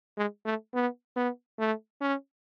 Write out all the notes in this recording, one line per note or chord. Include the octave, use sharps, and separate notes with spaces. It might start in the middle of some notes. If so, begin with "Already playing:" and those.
G#3
A3
B3
B3
A3
C#4